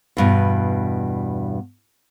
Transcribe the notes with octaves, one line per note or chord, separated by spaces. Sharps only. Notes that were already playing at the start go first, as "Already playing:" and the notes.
E2 G2 B2